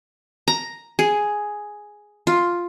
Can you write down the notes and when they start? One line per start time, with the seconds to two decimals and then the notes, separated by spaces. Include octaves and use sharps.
0.48 A#5
0.99 G#4
2.27 F4